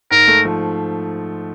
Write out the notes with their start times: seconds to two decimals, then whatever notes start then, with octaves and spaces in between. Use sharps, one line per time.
0.11 G#2 A#4
0.28 A3
0.45 F3